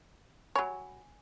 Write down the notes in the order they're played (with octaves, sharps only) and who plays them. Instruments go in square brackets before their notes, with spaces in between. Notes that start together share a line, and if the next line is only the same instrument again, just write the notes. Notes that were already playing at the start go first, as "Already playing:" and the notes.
[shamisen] F#3 C#5 [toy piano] G#5 B5